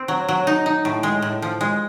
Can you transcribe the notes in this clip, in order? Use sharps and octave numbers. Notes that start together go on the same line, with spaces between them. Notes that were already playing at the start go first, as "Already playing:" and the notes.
Already playing: C4
F#3
F#3
D#4
D#4
A2
G#3
A2
F3
G#3